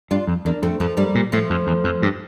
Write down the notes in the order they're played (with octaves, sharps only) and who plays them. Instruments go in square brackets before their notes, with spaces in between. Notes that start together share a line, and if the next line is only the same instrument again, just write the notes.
[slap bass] G2 [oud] D4 F4
[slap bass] F2
[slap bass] E2 [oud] A#3 D4
[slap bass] F2 [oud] A3 C4
[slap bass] F2 [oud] F3 A3
[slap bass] G2 [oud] G3 A#3
[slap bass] A#2
[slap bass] A2 [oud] F3 A3
[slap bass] F2
E2
F2
G2